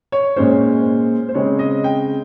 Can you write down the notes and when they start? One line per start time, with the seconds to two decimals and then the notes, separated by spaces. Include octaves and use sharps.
0.12 C#5
0.36 A#2 G#3 C#4 C5
1.29 C5
1.34 C#3 G#3 C4 C#5
1.59 D#5
1.84 G5